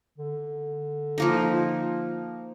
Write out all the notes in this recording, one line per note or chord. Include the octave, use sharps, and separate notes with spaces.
D3
F3 A#3 D#4